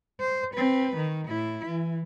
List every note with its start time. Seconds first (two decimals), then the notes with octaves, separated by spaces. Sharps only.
0.20 C5
0.55 C4 B4
0.97 D#3
1.28 A2 E4
1.66 E3